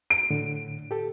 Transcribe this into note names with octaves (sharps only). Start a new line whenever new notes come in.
D7
A2 D3
G4 A4